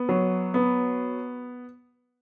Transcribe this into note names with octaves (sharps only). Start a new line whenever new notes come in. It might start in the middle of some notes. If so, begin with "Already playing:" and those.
Already playing: B3
F#3
B3